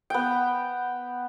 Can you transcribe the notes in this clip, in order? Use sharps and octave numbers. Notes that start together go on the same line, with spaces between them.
B3 G5